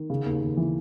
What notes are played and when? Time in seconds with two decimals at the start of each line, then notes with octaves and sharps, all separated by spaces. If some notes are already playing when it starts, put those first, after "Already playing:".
Already playing: D#3
0.10 C#3
0.25 D#2
0.41 D#2
0.57 E3